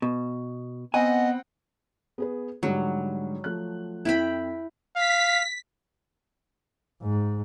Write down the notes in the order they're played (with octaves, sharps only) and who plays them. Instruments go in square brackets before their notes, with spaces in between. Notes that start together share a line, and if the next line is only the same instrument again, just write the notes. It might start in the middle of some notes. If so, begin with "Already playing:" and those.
[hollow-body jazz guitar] B2
[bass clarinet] B3 [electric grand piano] C4 F#5 [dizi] D#5 [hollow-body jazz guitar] G#5
[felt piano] B3 G#4 B4
[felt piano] G#2 D3 G3 [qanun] F#3
[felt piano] F3 A3 F#6
[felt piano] F2 [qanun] E4 G5 B5
[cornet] F5 [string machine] B6
[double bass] G#2